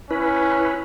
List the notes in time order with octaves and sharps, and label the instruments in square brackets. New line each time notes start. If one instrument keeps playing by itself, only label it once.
[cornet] C#4 [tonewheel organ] E4 B4